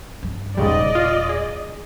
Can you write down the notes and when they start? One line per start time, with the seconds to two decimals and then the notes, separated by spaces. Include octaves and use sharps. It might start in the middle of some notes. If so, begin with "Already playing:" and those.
0.23 G2
0.57 D#1 E2 G#2 C#3 G3 D5 D#5
0.95 F4
1.29 G#4